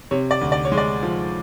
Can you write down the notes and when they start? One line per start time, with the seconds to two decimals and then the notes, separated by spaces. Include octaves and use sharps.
0.11 C3 C#5
0.31 D5
0.41 D2
0.52 D5
0.65 C#5
0.72 G#3
0.77 D5
1.03 F3